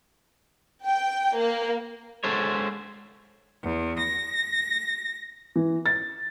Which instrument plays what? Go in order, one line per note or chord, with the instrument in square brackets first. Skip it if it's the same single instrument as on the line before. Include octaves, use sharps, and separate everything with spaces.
[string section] G5
A#3
[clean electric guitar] G#3 A4 C5 C#5
[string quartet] E2
A#6
[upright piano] E3
A6